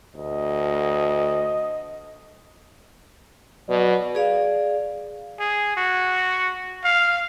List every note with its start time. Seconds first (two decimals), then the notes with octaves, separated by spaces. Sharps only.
0.15 D2 D#5
3.69 B2 F#3 D5
4.15 G#4 D5 F5
5.40 G#4
5.77 F#4
6.84 F5